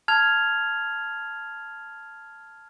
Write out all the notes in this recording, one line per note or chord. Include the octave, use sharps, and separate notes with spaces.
A5 F6 G#6 F7